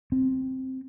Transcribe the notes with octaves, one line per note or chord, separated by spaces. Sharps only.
C4